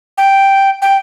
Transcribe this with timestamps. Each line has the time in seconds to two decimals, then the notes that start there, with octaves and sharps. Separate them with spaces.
0.18 G5
0.82 G5